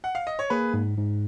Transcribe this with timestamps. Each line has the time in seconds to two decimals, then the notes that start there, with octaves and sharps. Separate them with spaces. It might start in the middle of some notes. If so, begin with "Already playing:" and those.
0.04 F#5
0.15 F5
0.27 D#5
0.39 C#5
0.50 A#3 G#4 B4
0.74 G#2
0.97 G#2